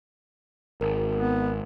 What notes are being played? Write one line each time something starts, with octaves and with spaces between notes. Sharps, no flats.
G#1 A#4
B3